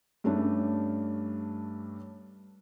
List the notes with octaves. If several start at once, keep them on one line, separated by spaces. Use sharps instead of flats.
G2 A3 C#4 D4